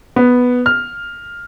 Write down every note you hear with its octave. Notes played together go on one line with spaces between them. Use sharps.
B3
F6